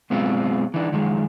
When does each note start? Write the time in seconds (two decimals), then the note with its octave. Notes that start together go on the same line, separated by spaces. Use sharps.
0.10 F#2 B2 G#3 C4 F4
0.74 E3 D4 D#4
0.92 F#2 D#3 F3 G#3